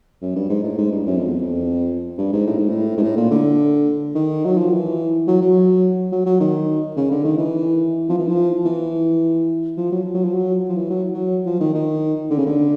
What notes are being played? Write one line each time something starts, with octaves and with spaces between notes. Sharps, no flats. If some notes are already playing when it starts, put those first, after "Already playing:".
F#2
G2
G#2
A2
G#2
G2
F#2
F2
E2
F2
G2
G#2
A2
G#2
A2
G#2
A2
A#2
D3
D#3
F#3
F3
E3
F#3
F#3
F#3
F#3
D#3
C#3
D3
D#3
E3
F3
E3
F3
E3
F3
F#3
F#3
F3
F#3
F3
E3
F#3
F#3
F3
D#3
D#3
D3
C#3
D3